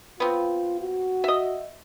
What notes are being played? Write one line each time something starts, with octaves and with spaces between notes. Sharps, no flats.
B3 C4 F4
F#4
D#5 E5